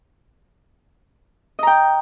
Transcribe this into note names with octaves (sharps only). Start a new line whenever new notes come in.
D#5 G5 A#5